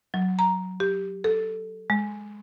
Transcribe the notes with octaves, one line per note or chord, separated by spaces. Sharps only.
F#3
A#5
G4
A4
G#3